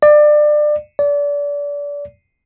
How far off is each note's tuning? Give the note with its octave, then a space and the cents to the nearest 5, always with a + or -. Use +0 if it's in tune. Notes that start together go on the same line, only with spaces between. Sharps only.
D5 +25
D5 -30